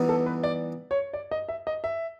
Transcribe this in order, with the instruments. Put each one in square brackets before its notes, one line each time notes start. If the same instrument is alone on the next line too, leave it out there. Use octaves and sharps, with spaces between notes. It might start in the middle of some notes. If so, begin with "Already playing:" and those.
Already playing: [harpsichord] E3 G3 B3 D#4
[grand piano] A4
B4
D5
C#5
D5
D#5
E5
D#5
E5